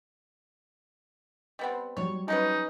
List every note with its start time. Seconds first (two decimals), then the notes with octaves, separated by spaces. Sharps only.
1.59 G3 B3 C4
1.97 F#3 G3 C#5
2.28 G#3 C#4 D#4 B4